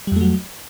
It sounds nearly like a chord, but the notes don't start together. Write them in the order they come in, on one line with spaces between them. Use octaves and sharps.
G3 F2 A3 F#3